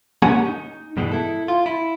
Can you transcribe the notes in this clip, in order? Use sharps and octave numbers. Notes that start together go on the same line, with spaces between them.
A#3 C#4 G4 F#5 G#5
D#4
G2 B2 E3 G#3
E4 A4
F4
E4